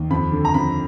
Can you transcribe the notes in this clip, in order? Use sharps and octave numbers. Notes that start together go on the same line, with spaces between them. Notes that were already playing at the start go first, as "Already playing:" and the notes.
Already playing: D#2
F2 B5
D3
A#5
F2 B5